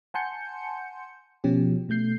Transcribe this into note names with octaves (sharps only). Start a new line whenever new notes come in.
F#5 G#5 A5 C6 G6 C#7
B2 F3 C#4 G4
B2 A3 G6 C7